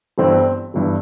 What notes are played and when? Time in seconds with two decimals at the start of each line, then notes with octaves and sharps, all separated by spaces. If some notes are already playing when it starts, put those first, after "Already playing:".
0.18 G1 G2 E3 C4
0.74 G1 G2 E3